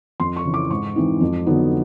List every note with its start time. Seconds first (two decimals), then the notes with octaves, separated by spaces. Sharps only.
0.20 F2 C6
0.37 C#6
0.45 C#3 E3
0.54 D6
0.70 G#2 C#6
0.96 E3 G#3 C4 D#4
1.21 F2
1.46 D3 F#3 B3 D#4